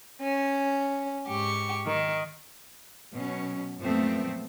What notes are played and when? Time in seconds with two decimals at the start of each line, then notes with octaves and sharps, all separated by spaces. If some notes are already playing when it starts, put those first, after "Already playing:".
0.21 C#4
1.27 G#2 G4 C#6
1.86 D#3
3.13 B2 F#3 C#4
3.78 F#2 A#2 F3 A3 B3 C4